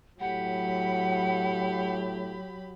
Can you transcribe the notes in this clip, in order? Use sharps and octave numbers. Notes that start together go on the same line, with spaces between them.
A2 F#3 G4 F#5 B5